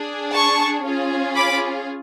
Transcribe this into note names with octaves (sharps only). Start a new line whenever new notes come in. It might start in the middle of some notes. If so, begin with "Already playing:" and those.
Already playing: D4 G#4
A5 C#6
C#4 F4 G#4
B5 D6